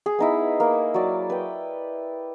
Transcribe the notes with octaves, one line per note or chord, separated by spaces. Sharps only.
G#4
B3 D#4 E4
A#3
F#3 D5
B4 G5